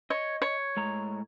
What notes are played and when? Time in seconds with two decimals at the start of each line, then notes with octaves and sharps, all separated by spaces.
0.10 C#5 D#5
0.42 C#5
0.77 A2 G#3 A#5